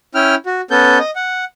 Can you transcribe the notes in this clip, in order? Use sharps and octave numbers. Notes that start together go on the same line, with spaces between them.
C#4 E4 G5 F6
F#4
B3 C#4 A4 G6
D#5
F#5